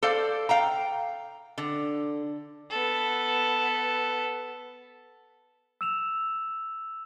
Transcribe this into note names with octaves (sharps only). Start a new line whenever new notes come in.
A4 C5 D5 F5
F5 G5 A#5
D3
B3 A4
E6 E7 F7